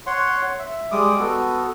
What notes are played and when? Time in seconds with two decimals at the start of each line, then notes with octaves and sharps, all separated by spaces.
0.06 C#5 F#5 C6
0.59 E5
0.91 G3 G#3 D6 D#6
1.19 B3 F#4 A4